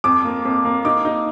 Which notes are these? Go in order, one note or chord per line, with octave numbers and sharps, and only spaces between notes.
F2 D6
A#3
F2
A#3
D#4 D6
D#4